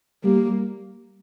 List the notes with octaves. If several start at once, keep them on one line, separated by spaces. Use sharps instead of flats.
G3 A#3